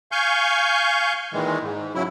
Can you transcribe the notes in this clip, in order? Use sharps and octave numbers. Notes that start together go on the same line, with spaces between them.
F5 G#5 C#6 G6
A#2 D#3 E3 G#3
G#2
C#3 F#3 E4